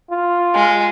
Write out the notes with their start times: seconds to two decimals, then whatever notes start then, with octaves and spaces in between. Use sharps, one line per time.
0.11 F4
0.55 G#3